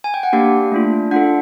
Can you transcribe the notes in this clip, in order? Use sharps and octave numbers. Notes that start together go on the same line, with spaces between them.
G#5
G5
F#5
A#3 D4 G4 F5
A3 D4 F4
D4 F4 A4 F#5